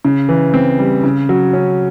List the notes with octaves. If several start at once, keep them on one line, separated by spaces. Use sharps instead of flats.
C#3
E3
C4
G3
C#3
F#3
C#4